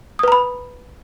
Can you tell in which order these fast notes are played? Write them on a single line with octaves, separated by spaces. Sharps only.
D#6 B4 A#5 B5